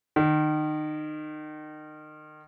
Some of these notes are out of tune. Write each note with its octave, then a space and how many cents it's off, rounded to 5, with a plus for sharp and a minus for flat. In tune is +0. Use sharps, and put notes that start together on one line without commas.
D#3 -30